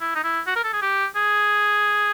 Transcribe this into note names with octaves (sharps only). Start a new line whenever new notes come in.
E4
D#4
E4
F#4
A#4
A4
G#4
G4
G#4